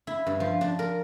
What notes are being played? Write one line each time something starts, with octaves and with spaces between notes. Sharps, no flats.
E4
G2
F3
D4
A#4